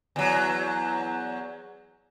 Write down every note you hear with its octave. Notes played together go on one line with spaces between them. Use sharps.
E2 F#3